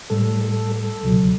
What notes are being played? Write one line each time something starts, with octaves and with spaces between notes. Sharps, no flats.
A2 G3 A4
A4
A4
C#2 B2 F#3